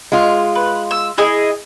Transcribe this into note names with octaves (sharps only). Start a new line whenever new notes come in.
G#3 F4
B4
E6
E4 G#4 D#5